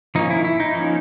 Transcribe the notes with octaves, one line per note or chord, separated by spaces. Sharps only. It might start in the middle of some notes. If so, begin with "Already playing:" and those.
F3 A#3 C#4 D#4
E4
E4
D#4
F3 A#3 C#4